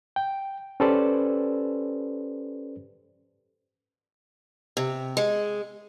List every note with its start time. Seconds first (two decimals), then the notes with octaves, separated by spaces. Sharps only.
0.16 G5
0.80 C#4 G4 A4 B4 C5 D5
4.77 C3
5.17 G#3